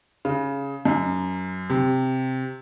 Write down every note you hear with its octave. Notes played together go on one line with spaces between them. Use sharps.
C#3
F#2
C3